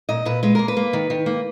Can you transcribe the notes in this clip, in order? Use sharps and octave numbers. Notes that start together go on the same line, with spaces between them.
A#2 D#5
A#2 B4
G#3 B4
A#3 A#4
B4
A#3
D#3
D#3
A#3